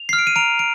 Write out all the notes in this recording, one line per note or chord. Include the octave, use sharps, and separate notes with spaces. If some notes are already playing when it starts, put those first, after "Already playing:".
Already playing: F7
C7
F6
D7
D#7
A#5 D7 F7
D7